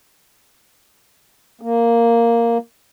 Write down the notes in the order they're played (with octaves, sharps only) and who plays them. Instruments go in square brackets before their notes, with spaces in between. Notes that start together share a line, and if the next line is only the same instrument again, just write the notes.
[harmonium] A#3